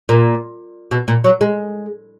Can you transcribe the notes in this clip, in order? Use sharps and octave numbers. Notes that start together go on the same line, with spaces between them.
A#2
B2
A#2
F#3
G#3